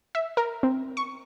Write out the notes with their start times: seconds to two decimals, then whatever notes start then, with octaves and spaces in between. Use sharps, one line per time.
0.15 E5
0.37 A#4
0.63 C4
0.97 C#6